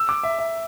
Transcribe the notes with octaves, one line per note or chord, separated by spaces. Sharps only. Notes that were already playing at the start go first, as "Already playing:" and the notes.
Already playing: E6
D6
E5
E5